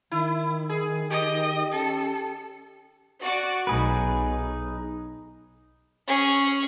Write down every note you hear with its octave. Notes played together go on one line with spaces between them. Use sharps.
D#3 E4
G#4
G4 D#5
C#4 A4
F#4 D5
B1 D#4 G#4 B4
C#4 G#4